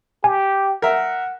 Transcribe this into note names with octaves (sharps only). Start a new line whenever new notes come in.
G4 G#5
A#4 E5 F#5